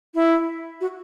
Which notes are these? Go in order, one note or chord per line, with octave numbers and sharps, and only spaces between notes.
E4
F#4